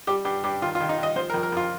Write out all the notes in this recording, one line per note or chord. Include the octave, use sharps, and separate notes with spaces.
G3 G4
G2 G4
G2 G4
D#3 F4
F4
D#3
D#4
D#3
D#5
F3 C5
A#4
F2
A#4
F2 F4